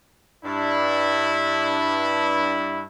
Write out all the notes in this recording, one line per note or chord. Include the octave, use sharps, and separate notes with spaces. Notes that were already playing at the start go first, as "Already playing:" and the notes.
G2 D4 E4